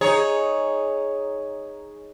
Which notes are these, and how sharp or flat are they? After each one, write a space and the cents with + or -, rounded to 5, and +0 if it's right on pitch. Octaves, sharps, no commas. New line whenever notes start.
D#4 +0 G#4 +0 C#5 +0